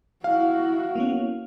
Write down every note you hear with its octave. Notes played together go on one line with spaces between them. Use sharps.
E4 F#4 F5
A#3 B3 C#4